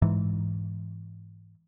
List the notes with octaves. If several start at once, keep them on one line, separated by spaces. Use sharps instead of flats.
G#2 E3